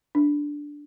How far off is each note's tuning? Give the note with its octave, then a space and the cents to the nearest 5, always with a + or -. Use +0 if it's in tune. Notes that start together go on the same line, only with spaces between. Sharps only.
D4 -5